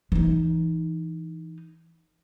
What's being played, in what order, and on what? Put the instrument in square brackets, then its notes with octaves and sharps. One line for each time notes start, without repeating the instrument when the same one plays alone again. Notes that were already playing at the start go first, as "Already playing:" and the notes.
[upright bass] E3 D#4